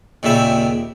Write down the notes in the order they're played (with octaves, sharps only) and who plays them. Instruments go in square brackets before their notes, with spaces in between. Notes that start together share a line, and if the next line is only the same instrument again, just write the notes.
[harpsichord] D#2 A#2 C#3 C4 E5